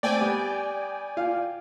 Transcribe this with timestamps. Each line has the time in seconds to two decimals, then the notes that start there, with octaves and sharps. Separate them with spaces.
0.03 A3 C4 D5 G5 G#5
0.21 G3 B3
1.17 F4 F5